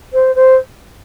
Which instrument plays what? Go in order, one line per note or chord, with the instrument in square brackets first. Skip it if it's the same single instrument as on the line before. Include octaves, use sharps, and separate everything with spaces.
[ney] C5
C5